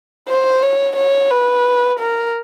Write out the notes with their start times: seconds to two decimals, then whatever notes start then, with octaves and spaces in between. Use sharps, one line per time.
0.28 C5
0.62 C#5
0.96 C#5
1.30 B4
1.99 A#4